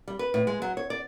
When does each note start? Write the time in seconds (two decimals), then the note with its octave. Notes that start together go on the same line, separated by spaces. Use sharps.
0.08 G3
0.19 B4
0.34 A2
0.47 G#3
0.62 F#3
0.77 C#5
0.90 D5